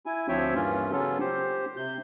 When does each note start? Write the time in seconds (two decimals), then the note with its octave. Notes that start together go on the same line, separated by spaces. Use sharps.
0.06 E4 G#5
0.28 D2 F3 C4 C#5 E5 G5
0.55 G2 E3 A#3 C#4 F4
0.92 C#3 F#3 B3 C#4 F4 A4
1.20 G4 C5
1.77 C3 G6